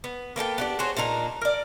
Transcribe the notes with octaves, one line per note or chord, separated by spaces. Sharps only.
B3
A#3 B3 A4 G5
B3 D4 G4
F#4 G#4 C5 C#5
A#2 D4 D#4 A#5
A#4 D5